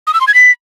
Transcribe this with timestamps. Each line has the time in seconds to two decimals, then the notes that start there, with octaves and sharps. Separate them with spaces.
0.07 D#6
0.14 E6
0.21 C6
0.28 G#6
0.34 B6